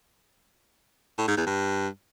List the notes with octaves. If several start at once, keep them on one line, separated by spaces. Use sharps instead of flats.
A2
G#2
E2
G2